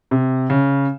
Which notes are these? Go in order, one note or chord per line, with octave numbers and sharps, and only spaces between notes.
C3
C#3